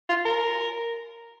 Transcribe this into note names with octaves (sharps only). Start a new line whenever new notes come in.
F4
A#4